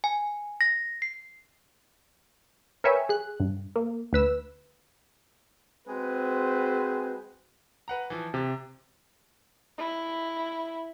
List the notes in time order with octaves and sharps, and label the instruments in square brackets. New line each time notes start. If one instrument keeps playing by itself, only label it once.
[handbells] G#5
A#6
C7
[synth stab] A#4 B4 C#5 E5 G5 G#5
G#4 F#6
G2
A#3
D2 B4 E6
[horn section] G#3 C4 F#4 G#4 B4 C5
[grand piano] B4 F#5 A#5
E3 F3
[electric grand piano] C3 [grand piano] G4 A6
[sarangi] E4